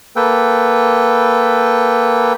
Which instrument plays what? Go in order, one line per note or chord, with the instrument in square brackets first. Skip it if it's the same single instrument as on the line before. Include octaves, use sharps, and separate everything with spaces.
[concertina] A#3 A4 B4 G5